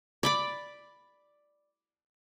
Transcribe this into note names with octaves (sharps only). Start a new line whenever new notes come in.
D5 B5 D6